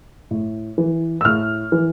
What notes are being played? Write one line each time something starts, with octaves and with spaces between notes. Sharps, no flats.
A2
E3
E6
A2 F6
E3